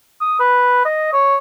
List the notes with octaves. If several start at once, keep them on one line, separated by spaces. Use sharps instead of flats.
D#6
B4
D#5
C#5